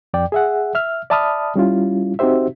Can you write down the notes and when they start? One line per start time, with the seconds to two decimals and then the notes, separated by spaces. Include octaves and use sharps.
0.14 F2 D5 G5
0.32 G#4 E5 F#5
0.75 E5 F6
1.10 D5 E5 A5 B5 D#6 F6
1.56 G3 C#4 E4 F4
2.19 C4 D#4 F#4 G4 C5 E5